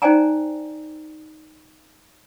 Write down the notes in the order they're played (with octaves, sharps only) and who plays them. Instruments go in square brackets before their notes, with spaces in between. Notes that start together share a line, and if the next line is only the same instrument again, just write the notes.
[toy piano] D#4 C5 D5 G5 G#5 A#5